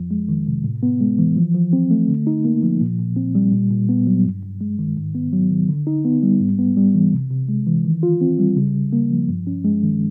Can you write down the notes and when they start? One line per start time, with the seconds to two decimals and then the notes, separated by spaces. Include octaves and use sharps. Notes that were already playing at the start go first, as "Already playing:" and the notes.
Already playing: F2 F3
0.11 G#3
0.29 D#3
0.47 C3
0.64 A2
0.83 B3
1.01 G#3
1.19 E3
1.37 F3
1.55 F3
1.73 C4
1.91 A3
2.09 D3
2.27 D#4
2.45 A#3
2.63 F3
2.81 A#2
2.99 A#2
3.16 C4
3.35 G3
3.53 A#2
3.70 A#2
3.89 B3
4.07 F#3
4.25 G2
4.43 G2
4.61 G#3
4.79 D#3
4.97 G#2
5.15 B3
5.33 F#3
5.51 D#3
5.69 D3
5.87 D#4
6.05 B3
6.23 G3
6.41 G#2
6.59 B3
6.77 G3
6.95 E3
7.13 C3
7.30 C3
7.49 G#3
7.67 E3
7.85 D#3
8.03 F4
8.21 C4
8.39 G3
8.57 C#3
8.75 C#3
8.93 A#3
9.11 F3
9.29 G2
9.47 C#4
9.64 G#3
9.83 D#3